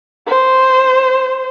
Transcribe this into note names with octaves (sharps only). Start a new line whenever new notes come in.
C5